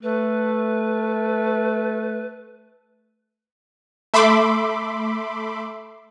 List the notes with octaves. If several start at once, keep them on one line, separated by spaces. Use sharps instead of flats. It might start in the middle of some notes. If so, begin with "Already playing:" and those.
A3 B4
A3 E5 B5 C6 D6